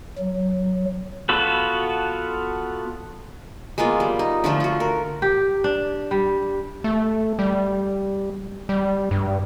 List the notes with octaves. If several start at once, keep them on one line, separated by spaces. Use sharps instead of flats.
F#3
B3 F4 F#4 A4 B4
G#3 A#3 B3 F4
G3
D#4
D3 F3 A3 F4
F4 F#4
A#4
G4
D4
G3
A3
G3
G3
G2